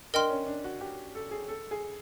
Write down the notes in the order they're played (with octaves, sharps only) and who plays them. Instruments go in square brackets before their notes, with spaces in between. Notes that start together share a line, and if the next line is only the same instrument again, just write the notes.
[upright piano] D4 [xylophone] A#4 D#5 G5 C6 F6
[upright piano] C#4
D4
F#4
G4
A4
G#4
A4
G#4